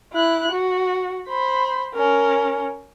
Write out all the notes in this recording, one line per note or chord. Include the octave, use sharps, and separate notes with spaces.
E4 F#6
F#4
C5 B5
C#4 A#4